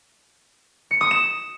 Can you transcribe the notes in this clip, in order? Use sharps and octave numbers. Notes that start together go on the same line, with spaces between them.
C#7
D#6
E7